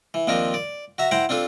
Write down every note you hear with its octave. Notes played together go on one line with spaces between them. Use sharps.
E3
D#2 F3 C4 D4 A#4
D5
F#4 E5 A#5
E4 C5 F#5 G5 A#5
C4 D4 F4 A4